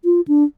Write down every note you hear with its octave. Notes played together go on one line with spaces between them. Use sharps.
F4
D4